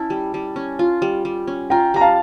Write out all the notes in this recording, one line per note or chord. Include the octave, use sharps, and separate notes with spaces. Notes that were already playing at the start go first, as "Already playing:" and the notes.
Already playing: C#4 E4 A5
G3
G3
C#4
F4
G3
G3
C#4
F4 G5 A#5
G3 A#5
F5 A5